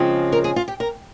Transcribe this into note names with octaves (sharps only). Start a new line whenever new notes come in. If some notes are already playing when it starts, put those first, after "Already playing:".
Already playing: C#3 F3 G#3 C4
A#4
G#4
F4
G4
A#4